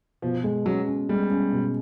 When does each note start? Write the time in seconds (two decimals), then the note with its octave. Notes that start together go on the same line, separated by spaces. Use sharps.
0.22 B2 F3
0.44 G#3
0.65 F#3 C#4
0.87 C#4
1.09 G3 G#3
1.30 C#4
1.52 B2